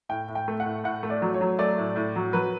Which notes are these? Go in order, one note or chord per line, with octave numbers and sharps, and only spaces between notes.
A2 G5
A2
G5
A3
F#5
A2
A2 F#5
A3
D5
F#3
C#5
F#3
A3 D5
A2
A2
F#3
F#3 B4